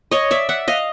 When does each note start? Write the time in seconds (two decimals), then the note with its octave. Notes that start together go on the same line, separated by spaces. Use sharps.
0.11 C#5 D#5
0.31 D5 E5
0.49 E5 F#5
0.68 D#5 F5